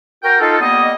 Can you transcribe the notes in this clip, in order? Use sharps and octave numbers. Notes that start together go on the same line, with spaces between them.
F#4 A#4 G5
D#4 F4 A4
G3 A#3 B3 D#5